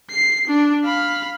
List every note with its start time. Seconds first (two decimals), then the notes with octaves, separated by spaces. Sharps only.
0.10 C7
0.48 D4
0.85 F5 B5